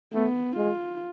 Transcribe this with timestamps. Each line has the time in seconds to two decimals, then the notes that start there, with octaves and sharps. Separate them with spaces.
0.14 A3 B3
0.56 G#3 F4